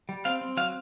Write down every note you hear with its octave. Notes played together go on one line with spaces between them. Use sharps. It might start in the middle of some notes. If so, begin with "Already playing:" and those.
G3
C4 F5
C4
F#3 F5